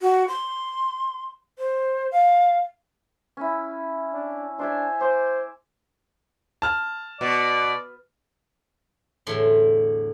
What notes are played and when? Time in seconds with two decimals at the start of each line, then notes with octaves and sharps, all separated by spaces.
0.01 F#4
0.28 C6
1.58 C5
2.12 F5
3.37 C#4 E4
4.14 D4
4.59 D4 C5 E5 G#5
5.01 C5 D6
6.62 A5 F6
7.21 B2 D5
9.27 E2 A2 D3 C6